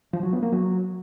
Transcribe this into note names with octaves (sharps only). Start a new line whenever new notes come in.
F3
F#3
B3
A#3
F#3